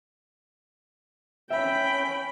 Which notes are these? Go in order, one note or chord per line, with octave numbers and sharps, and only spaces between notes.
C#4 E5 G5 B5